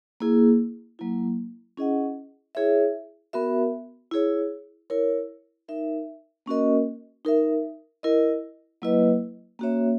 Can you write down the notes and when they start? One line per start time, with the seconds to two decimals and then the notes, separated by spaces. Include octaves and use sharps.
0.20 A#3 E4 G#4
0.99 F#3 A#3 E4
1.77 C#4 E4 G#4 D#5 F#5
2.55 E4 G#4 C#5 E5
3.33 B3 F#4 A#4 E5
4.11 E4 G#4 C#5
4.90 E4 A#4 C#5
5.68 D#4 A#4 E5
6.46 A#3 C#4 F#4 A#4 D#5
7.25 D#4 A#4 E5
8.03 E4 A#4 D#5
8.82 F#3 A#3 E4 B4 D#5
9.59 A#3 C#4 F#4 C#5 E5